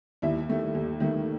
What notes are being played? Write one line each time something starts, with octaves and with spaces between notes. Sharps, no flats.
D#2 E4 E5
D#3 A3
D#2
D#3 A3